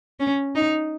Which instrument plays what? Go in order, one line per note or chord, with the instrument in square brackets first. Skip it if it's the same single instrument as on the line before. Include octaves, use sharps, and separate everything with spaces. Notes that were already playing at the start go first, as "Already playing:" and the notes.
[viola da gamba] C#4
D#4